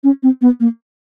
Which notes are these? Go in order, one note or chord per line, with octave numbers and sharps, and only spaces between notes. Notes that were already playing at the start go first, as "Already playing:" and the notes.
C#4
C4
B3
A#3